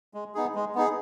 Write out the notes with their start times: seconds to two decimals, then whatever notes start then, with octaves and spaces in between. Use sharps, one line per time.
0.14 G#3
0.35 B3 D#4 G#4
0.55 G#3
0.75 B3 D#4 G#4